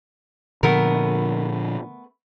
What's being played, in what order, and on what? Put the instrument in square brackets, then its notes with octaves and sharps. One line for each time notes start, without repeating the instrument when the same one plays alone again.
[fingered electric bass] A#2 D3 F3 [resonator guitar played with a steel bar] A3 B3 A#4